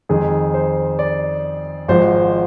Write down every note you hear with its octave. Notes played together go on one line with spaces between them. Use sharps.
F2 D#3 G#3 G#4
C5
D5
G#1 G#2 F3 C5